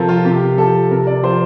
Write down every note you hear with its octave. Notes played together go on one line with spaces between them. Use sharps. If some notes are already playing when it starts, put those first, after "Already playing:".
Already playing: C3 F3 A4 A#4
F4
C3 G4
F3 A4
C3 A#4
D5
F3 C5